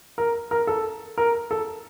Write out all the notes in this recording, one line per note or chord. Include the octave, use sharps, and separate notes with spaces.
A#4
A#4
A4
A#4
A4